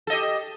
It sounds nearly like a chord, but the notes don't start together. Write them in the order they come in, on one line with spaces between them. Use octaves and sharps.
A4 D#5 G4